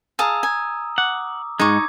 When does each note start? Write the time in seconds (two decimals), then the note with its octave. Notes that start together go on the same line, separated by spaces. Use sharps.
0.19 G#4 F5 A5 A#5 D#6 E6
0.43 G#5
0.98 F#5 D6
1.60 G#2 G#3 D#4 C#6 D6 G#6